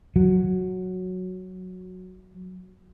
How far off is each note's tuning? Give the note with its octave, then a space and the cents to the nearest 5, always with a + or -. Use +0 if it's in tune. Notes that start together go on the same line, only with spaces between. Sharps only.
F#3 -5